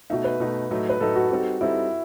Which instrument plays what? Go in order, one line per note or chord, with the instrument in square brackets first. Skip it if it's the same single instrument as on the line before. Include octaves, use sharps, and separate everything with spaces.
[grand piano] B2 A3 D#4 [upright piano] E5
[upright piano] B4
[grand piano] B2 A3 D#4
A2 F#3 A3 D#4
[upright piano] B4
[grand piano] A2 F#3 A3 D#4 [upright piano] A4
[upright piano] F#4
[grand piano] G3 C4 D#4 A4
[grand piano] G3 C4 D#4 A4 [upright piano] E4